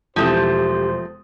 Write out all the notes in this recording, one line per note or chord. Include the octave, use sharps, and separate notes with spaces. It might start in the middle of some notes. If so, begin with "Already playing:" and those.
E1 E3 F3 A3 C4 G4 C5 D#6